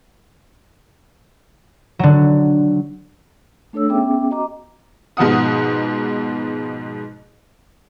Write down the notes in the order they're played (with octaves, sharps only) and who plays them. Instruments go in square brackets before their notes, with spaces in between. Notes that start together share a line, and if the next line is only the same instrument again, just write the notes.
[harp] D3 F#3
[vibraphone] A3 D4 A4 C#5 E6
B3 C#4 G#4 E5 G5 D6
F#4 D#5 A#5 D6
[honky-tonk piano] G#2 B2 F3 F#5 D#6